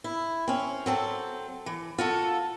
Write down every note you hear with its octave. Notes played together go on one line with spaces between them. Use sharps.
E4
C4 C#4
F#3 C4 A4
E3
F4 F#4 A4